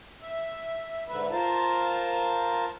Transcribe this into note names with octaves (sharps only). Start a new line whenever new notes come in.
E5
G#2 D3 B4 E5
F4 A#4 C5 A5